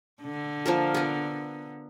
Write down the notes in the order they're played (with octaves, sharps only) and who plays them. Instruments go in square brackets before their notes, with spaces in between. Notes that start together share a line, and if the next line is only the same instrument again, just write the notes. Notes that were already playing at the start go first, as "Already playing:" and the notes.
[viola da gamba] D3
[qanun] F3 A#3 A#4
B3 A#4